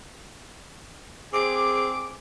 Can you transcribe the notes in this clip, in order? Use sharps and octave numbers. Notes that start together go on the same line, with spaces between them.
C4 G#4 D6